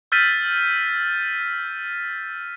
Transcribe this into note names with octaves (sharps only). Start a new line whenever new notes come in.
E6 F6 G6 A6 B6 D#7